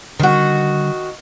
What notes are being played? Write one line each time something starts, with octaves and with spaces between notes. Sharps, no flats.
D3 D#3 G3 F#4